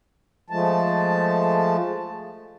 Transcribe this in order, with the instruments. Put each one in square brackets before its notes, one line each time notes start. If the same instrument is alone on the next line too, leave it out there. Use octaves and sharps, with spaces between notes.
[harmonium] F3 G#3 A3 A5